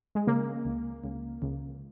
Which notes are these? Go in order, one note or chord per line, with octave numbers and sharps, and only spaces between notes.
G#3
C#3 A#3
C#2
C#2
C#2